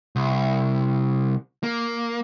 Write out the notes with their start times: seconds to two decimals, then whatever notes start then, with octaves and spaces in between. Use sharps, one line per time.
0.16 C2
1.63 A#3